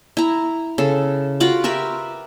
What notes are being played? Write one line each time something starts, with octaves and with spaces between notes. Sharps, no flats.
E4 A#5
C#3 A4
F4 F#4 B5 D6
G4 A#4 B4 E5